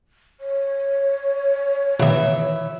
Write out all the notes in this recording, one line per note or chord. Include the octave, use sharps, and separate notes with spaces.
C#5
B2 D#3 E3 E5